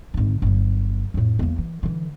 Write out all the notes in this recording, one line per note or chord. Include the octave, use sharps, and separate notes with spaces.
G#1 D3
G1 F#3
F2 A2
E2 A#3
E3
D3 E3